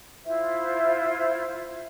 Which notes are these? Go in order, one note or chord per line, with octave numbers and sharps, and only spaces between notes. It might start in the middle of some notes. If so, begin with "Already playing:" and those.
E4 F4 C5 E5